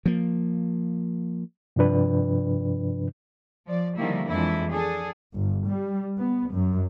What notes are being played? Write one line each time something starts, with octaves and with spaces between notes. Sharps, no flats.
F3 A#3
G2 C3 F3 D4 B4
F3 D5
D3 D#3 F3 G3 A#3 E4
F2 E3 F#3 G#3 D4 E4
D4 G#4 A4
G1
G3
B3
F#2